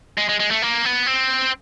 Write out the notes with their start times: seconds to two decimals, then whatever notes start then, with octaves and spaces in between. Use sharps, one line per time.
0.18 G#3
0.29 G#3
0.40 G#3
0.51 A3
0.62 A#3
0.85 B3
1.06 C4